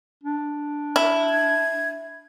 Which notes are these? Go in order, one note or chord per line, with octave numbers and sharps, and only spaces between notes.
D4
E4
G#6